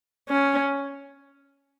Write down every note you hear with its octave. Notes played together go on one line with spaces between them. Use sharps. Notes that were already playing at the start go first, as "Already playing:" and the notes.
C#4